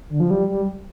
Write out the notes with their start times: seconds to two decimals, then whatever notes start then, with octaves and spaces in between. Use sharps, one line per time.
0.09 D3
0.20 F3
0.30 G3
0.48 G3